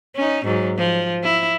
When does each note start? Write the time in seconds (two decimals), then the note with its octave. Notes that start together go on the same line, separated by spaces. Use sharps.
0.16 C#4 D#4
0.45 G#2 F#3
0.78 F3
1.24 E4